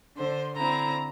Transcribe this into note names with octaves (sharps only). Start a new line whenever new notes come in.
D3 C5
D3 C4 E4 A#5